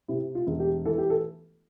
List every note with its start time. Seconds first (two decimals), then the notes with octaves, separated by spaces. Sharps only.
0.08 C3 E4
0.35 F4
0.47 E1
0.60 G4
0.85 E3 A4
0.98 G4
1.10 A4